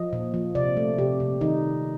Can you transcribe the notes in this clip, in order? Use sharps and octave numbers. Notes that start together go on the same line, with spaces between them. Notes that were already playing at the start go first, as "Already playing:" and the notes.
Already playing: F3 D#5
A#2
F3
C3 D5
A3
C3 G4
C3
D#3 D#4